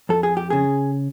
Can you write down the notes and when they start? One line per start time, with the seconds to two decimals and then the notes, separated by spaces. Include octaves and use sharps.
0.09 F2 A4
0.23 G#4
0.37 G4
0.50 C#3 G#4